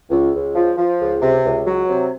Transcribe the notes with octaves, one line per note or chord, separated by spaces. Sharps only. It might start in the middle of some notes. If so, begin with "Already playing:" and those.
C#2
C#2
F3
F3
C#2
C3
C#2
F#3
C3